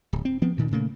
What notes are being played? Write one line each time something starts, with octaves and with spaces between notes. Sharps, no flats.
D1
C4
F3 B3 C4
D2 A#2 D#3
A#2 C#3 A3 A#3